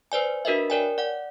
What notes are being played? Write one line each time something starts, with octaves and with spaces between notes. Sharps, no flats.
B4 C5 D5 G#5
D4 F#4 A#4 B4 D#5 E5
A#4 C#5 D5 G5 G#5
D5 F#5